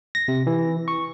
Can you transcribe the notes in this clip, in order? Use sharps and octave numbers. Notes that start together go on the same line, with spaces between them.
A#6
C3
E3
C#6